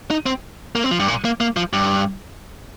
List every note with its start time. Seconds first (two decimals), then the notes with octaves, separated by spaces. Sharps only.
0.11 D#4
0.26 C4
0.75 A#3
0.84 C4
0.91 F3
1.00 G2
1.08 A#2
1.25 A#3
1.41 A#3
1.57 F3
1.73 G2